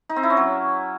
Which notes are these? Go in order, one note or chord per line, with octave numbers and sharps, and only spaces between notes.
D#4
C4
E4
C#4
F#3